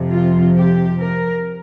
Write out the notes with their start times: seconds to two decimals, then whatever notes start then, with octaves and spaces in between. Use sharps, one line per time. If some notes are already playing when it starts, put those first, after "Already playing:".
Already playing: F2 C3 F3
0.09 F4
0.55 G4
1.00 A#4